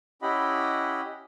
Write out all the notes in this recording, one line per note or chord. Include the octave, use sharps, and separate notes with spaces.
C#4 E4 G4 D#5 F#5 B5